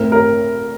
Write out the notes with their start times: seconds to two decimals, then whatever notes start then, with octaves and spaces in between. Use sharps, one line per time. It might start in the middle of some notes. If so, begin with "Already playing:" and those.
Already playing: A2 A3 C4 A#4
0.12 A#4